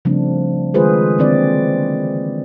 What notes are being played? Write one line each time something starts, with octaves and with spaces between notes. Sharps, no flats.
C#3 F3 G3 A3 C4 D4
D#3 G#3 F4 G#4 B4 C5
D3 E3 A#3 C4 E4 D5